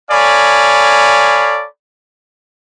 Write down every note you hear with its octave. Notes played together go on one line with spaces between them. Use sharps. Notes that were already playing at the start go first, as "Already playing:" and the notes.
A4 C#5 D5 F5 G#5 B5